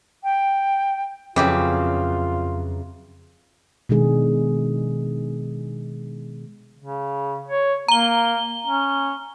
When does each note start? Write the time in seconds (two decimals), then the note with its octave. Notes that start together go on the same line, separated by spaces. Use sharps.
0.23 G5
1.36 F2 C#3 E3 F#3 F4 G4
3.89 B2 D#3 G#3 D4 D#4 G#4
6.79 C#3
7.48 C#5
7.88 A#3 A#5 G7
8.66 C#4